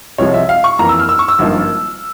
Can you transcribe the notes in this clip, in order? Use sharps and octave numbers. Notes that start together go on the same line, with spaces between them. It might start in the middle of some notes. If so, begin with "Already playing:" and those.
C2 C3 F3 G#3 C#5
E5
F5
C#6
F2 E3 A#3 A#5
E6
F6
E6
C#6
E6
G#1 G2 F3 A#3